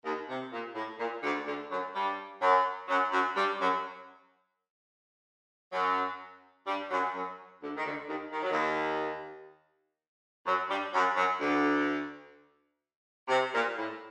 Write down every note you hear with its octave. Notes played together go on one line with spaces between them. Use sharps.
D#2 D#3
C3
A#2
A2
A#2
D2 D3
D2 D3
F#2 F#3
G2 G3
F#2 F#3
F#2 F#3
F#2 F#3
G2 G3
F#2 F#3
F#2 F#3
G2 G3
F#2 F#3
F#2 F#3
D2 D3
D#3
D2 D3
D#2 D#3
D#3
F#3
D#2 D#3
F#2 F#3
G2 G3
F#2 F#3
F#2 F#3
D2 D3
C3
A#2
A2